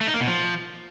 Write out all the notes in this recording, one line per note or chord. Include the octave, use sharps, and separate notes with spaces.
A3
D#4
A#3
B2
F3